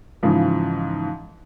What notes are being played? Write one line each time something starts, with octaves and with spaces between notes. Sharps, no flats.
G#2 C#3 E3 F3